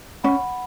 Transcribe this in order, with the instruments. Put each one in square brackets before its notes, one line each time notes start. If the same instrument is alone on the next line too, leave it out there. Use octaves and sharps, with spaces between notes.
[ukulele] C#4 [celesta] F#5 B5